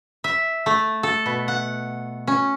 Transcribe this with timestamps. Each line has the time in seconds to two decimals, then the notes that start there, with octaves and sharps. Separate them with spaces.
0.24 E5
0.66 A3
1.03 A4
1.26 B2
1.48 F#5
2.27 C#4